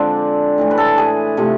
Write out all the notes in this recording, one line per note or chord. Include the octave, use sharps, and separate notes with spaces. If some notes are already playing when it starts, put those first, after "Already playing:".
Already playing: D3 F3 G#3 C4 D4 D5
A2 E3 A3
B4
A4
G#4
C3 F3 A3